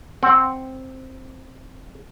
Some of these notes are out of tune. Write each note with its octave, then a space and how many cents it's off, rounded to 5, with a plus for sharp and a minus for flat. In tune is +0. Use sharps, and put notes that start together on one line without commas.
C4 +0 F#5 +0